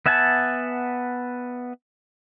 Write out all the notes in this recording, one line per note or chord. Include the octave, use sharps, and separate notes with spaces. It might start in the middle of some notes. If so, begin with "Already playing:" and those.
B3 E5 F#5 G#5 A5